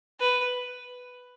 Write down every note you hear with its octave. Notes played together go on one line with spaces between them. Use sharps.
B4